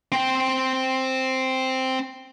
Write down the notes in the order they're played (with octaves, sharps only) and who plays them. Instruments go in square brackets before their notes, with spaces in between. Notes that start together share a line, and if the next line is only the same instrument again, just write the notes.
[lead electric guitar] C4 G5